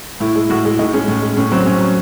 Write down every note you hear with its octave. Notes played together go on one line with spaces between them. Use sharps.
A2 E4
G#3
A2 F#4
G#3 E4
A2 D#4
G#3 C#4
A2
G#3
A2 C#4
F#3 C4
A2 C#4
F#3